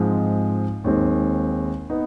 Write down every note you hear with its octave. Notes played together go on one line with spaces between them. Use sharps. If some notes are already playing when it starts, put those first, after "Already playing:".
Already playing: G#2 F3 G#3 C4
D#2 D#3 G#3 C4
B3 D#4